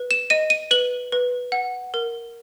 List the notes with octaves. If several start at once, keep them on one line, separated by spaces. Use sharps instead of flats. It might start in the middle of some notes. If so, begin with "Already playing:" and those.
Already playing: B4
E7
D#5 D#7
D#7
B4 F#7
B4
F#5
A#4